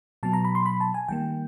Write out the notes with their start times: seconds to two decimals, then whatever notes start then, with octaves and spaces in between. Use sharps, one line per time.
0.23 B2 F#3 B3 A5
0.33 A#5
0.44 B5
0.55 C6
0.66 B5
0.80 A5
0.94 G#5
1.08 D#3 G3 A#3 G5